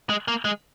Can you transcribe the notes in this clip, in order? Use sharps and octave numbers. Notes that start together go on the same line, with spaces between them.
G#3
A#3
G#3